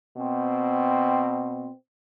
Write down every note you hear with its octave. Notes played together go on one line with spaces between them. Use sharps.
B2 C4